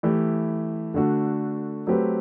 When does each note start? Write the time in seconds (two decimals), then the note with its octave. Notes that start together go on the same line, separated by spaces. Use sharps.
0.03 E3 A3 E4 G4
0.94 D3 A3 D4 F#4
1.87 F#3 A3 C4 G4 B4